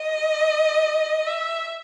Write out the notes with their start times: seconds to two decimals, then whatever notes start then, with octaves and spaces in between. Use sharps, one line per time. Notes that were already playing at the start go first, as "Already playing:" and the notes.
Already playing: D#5
1.26 E5